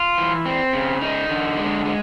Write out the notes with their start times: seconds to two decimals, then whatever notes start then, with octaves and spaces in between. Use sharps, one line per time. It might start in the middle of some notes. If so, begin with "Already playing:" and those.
Already playing: F4
0.18 E3
0.46 C4
0.73 C#3
1.01 D#4
1.29 D3
1.57 G#3
1.85 G#3